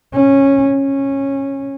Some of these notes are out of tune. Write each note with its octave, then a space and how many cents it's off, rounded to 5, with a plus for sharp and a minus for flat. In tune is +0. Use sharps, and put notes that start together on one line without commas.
C#4 -10
C#4 -15